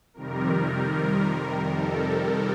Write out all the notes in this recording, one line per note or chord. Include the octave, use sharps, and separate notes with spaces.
F2 C3 D#3 G3 A#4
A4